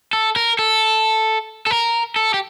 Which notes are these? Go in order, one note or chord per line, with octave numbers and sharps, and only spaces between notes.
A4
A#4
A4
A4
A#4
A4
G4